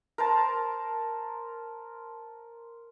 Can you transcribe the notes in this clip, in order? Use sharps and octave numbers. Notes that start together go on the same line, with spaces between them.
A#4 C5 A5